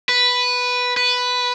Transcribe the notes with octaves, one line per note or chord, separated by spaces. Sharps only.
B4
B4